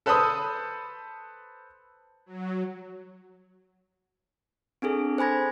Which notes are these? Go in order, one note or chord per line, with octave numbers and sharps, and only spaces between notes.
A4 B4 C5 A5 B5 D#6
F#3
C4 D4 G#4 A4
C5 G#5 B5 G#6 A#6